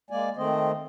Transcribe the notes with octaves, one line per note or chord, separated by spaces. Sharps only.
G#3 A#3 D5 G#5
D#3 A3 C4 C5 D#5